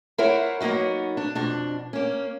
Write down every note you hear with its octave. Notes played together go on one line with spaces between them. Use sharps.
E4 G#4 A#4 C5 C#5 F#5
F#3 A#3 B3 D#4 F#4
D4
F2 B2 D4
A#3 C#4